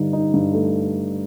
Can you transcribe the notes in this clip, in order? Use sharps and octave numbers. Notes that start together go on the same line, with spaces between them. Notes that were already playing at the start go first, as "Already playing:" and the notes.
Already playing: G2 D3 D#4
D#4
G2
A3